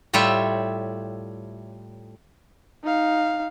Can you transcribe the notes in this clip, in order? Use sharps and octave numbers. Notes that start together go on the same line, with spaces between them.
A2 G3 F4 C#5 E5 G5
D#4 F5